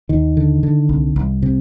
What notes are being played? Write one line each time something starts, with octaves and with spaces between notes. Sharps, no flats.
D#2 D#3
D3
D3
C2
C2
C3